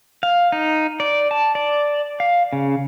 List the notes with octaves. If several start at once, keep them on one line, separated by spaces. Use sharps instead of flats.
F5
D#4
D5
A5
D5
F5
C#3